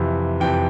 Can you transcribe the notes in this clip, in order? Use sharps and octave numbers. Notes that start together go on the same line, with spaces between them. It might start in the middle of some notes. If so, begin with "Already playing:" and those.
Already playing: F2 C3 E3
F2 C3 E3 G5